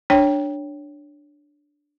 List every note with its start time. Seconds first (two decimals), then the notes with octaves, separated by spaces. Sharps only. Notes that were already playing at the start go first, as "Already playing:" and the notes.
0.10 D4 C#5 G5